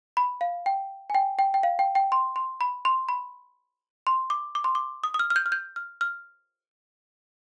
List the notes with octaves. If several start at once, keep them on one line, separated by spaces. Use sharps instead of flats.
B5
F5
G5
G#5
G5
G5
G5
F5
G5
G5
C6
C6
B5
C6
B5
C6
D6
D6
C6
D6
D#6
D#6
F6
F6
G6
F6
G6
F6
F6